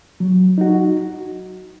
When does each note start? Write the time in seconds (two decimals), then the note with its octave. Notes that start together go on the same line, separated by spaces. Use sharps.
0.20 F#3
0.58 D#4 F#4